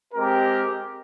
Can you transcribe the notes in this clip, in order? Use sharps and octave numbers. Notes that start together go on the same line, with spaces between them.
G#3 C4 G4 A#4